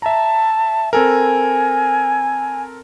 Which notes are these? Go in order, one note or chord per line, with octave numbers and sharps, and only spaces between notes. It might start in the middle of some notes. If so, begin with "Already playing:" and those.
E5 A5 A#5
C4 A4 A#4 G#5